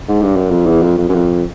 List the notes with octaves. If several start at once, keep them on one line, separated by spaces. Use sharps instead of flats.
G#2
G2
F#2
F2
E2
F2
F2
F#2
F2